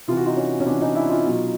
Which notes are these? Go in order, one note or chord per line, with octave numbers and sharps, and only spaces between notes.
C3 E3 F4
F#4
D#4 F4
C#4 D#4
C#4
C3 E3 C4 D4
C#4 D#4
D4 E4
D#4 F4
B2 F#3